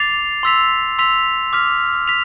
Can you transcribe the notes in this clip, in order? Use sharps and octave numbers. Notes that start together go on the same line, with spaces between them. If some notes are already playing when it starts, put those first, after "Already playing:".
Already playing: D6 A6 C7 F7
C6 E6 B6 F7
C6 E6 B6 F7
D6 F6 B6 F7
B6 F7